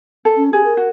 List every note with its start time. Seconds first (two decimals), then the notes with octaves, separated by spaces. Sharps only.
0.25 A4
0.37 C#4
0.53 G4 G#4
0.65 A#4
0.77 F#4